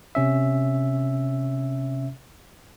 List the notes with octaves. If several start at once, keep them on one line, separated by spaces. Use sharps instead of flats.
C3 C#4 E5